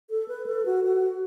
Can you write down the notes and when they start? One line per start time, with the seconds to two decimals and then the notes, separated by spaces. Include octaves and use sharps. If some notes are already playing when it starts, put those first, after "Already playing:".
0.10 A4
0.28 B4
0.46 A4
0.66 F#4
0.84 F#4